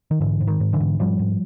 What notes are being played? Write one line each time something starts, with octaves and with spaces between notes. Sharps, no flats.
D#3
G#2 D3 E3
G#2
D#3
G#2
D3 E3
G#2
G#2 F3 G3
G#2